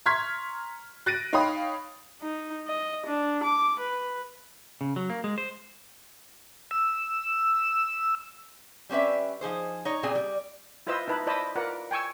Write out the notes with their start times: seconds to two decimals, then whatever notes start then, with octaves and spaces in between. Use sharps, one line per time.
0.06 A#5 C6 C#6 F6 G#6 B6
1.06 F#6 A6 A#6 D7 D#7
1.33 D#4 C#5 F5 G5 B5 D#6
2.21 D#4
2.67 D#5
3.06 D4
3.43 D6
3.79 B4
4.81 C#3
4.96 F#3
5.10 A#3
5.24 G#3
5.38 C5
6.71 E6
8.89 G3 C4 C#4 B4 E5
9.41 F3 D#4 G#4 C5
9.85 D#4 C#5
10.03 A#2 G3 C4 G#4 G#5
10.15 G3
10.87 E4 F4 B4 C5 D#5 E6
11.08 D#4 E4 B4 A5
11.27 E4 C5 D5 D#5 A5 B5
11.55 F4 A#4 B4 D5 F#5
11.91 G5 G#5 C#6 E6